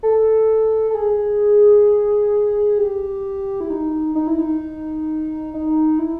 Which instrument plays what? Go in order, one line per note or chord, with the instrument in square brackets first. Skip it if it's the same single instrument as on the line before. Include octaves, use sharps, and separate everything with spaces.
[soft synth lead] A4
A4
G#4
G4
E4
D#4
D#4
E4
D#4
D#4
E4